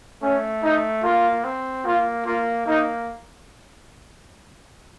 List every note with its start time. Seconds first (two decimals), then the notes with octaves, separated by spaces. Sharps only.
0.22 A3 C#4
0.63 D#4
1.03 A#3 F4
1.44 C4
1.85 A#3 F4
2.26 A#3 F4
2.66 A#3 D#4